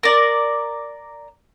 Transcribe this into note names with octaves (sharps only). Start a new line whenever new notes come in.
A#4 D5